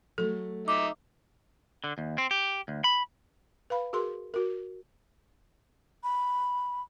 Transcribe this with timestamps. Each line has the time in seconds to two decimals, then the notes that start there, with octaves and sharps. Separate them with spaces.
0.18 F#3 A3 A4
0.68 D#4 E5 D6
1.84 D3
1.98 D#2
2.18 C4
2.31 G4
2.68 D2
2.84 B5
3.70 B4 F5 B5
3.93 F#4 G#4 A#4 C6
4.34 F#4 A#4
6.04 B5